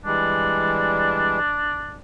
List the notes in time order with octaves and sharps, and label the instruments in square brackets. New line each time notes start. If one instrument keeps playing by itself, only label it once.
[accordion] E3 G3 G#3 [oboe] D4